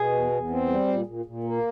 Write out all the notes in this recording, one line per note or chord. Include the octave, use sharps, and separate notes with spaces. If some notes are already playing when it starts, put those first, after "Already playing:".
Already playing: B2 G#4
E2
E2
C4
G3
A#2
A#2
A#2
A#3